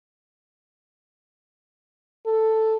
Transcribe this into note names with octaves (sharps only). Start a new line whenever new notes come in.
A4